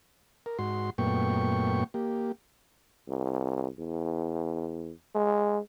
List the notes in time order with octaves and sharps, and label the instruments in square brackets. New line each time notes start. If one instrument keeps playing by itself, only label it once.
[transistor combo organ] A#4
G#2 F#4 C6
F#2 A#2 A3 B3 G5 C#6
A#3 G4
[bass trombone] C2
E2
G#3